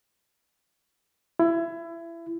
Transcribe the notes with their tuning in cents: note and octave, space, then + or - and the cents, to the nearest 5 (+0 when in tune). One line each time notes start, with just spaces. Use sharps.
E4 +25